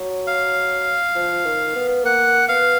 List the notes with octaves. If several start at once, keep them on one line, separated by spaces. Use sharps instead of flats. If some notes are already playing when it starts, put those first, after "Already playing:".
Already playing: F#3
F5
F3
D#3
B3
A#3 F#5
B3 F5